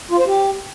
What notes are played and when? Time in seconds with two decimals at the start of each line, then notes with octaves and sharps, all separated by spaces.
0.11 F4
0.19 C5
0.27 G4